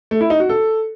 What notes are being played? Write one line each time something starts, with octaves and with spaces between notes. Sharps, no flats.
A3
E4
D#4
F#4
A4